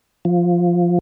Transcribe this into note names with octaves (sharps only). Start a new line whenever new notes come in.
F3